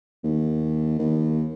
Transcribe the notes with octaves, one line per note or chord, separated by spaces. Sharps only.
D#2
D#2